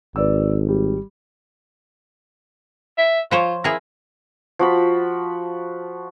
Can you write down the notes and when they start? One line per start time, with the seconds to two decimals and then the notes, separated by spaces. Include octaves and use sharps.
0.16 G#1 B4 D5 E6
0.69 G3
2.98 E5
3.31 F3 F4 C5 C#5
3.64 E4 G#4 A#4
4.59 F3 F#4 B5